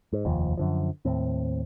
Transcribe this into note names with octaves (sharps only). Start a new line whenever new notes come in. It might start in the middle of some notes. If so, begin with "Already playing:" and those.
G#2
F1 D#2 F3
F#2 D3 F3
D#2 A2 C4